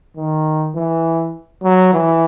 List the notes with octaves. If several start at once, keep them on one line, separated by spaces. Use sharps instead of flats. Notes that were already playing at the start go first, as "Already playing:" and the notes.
D#3
E3
F#3
E3